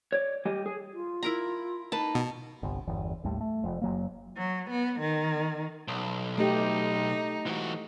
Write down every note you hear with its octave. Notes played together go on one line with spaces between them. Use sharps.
C#5 D5
G3 G4 D#5
G#4
F4
E4 A#4 A#5
A#3 D#4 B4 A5
B2
G1 C2
G1 E2
A1 D#2 A2 G3
A3
F1 F2
F#1 F#3 A#3
F#3
B3
D#3
B1
A3 D#4 G4
E3 F#4